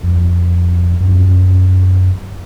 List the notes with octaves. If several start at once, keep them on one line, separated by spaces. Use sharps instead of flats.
F2
F#2